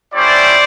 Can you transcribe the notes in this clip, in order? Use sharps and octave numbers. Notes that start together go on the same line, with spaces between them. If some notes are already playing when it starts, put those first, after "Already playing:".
A3 C#4 E4 G4 C5 D5